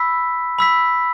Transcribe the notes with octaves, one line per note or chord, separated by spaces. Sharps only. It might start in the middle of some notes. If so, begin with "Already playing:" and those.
Already playing: B5 E6 B6
B5 E6 B6